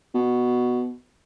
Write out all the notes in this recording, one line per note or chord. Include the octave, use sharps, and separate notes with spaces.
B2